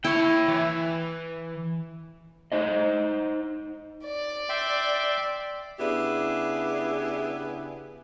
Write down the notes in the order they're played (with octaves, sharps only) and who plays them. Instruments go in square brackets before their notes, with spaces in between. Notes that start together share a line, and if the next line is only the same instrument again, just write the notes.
[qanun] E4 [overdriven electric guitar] C#5 G5
[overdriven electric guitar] E3
[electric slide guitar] D#4 C5 D#5
[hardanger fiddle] D5
[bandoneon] E5 G5 C6
[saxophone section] C#3 B3 D4 E4 G4 G#4